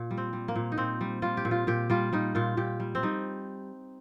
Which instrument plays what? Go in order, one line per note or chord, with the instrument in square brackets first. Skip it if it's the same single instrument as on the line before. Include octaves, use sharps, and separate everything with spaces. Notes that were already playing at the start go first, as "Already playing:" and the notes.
Already playing: [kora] A#2
G3
C4
G3
A#3
A#2
D#4
A#2 C4
G3
G3 F4
G4
A#2
F4
A#2 G4
G3 F4
G3 D#4
A#2 F4
A#2 G4
G3
C4
G3 D#4